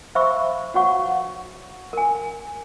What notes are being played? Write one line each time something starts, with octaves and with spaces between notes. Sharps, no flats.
C5 E5 F5 B5 C#6 E6
F#4 B4 C#5 F5 F#5 C#6
A#4 G#5